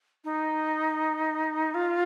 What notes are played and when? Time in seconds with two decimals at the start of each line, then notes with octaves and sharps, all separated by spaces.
0.24 D#4
1.74 F4